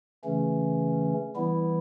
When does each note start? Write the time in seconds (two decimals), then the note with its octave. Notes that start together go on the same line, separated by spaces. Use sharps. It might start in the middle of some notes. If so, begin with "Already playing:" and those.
0.24 C#3 E3 A3 C#4
1.36 E3 G3 B3 E4